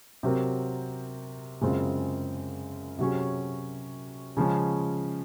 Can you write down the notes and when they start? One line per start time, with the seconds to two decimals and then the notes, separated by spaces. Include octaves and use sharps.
0.23 C3 F#3 C4 F#4 A#4
1.61 F#2 C#3 G#3 C4 F4
2.99 C3 F#3 C#4 G#4
4.37 C#3 F3 G#3 C#4